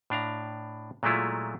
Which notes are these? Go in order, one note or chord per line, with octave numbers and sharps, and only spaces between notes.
A2 D4 F5 A#5
A#2 F#3 G#3 A3 E4 F4